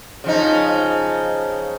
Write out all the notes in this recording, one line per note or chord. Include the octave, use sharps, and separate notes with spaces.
C#3 F3 D#4